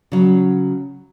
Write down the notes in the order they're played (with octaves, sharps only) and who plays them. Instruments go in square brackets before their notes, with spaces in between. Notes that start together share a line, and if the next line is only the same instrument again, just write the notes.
[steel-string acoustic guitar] C#3 F#3